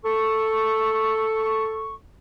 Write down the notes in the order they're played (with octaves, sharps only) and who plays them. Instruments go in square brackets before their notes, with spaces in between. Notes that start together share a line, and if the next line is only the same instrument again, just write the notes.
[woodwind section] A4 C#6